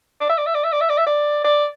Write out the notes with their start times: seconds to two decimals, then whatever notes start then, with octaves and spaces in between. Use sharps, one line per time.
0.21 D5
0.29 E5
0.38 D5
0.46 E5
0.55 D5
0.64 E5
0.72 D5
0.81 E5
0.89 D5
0.98 E5
1.06 D5
1.44 D5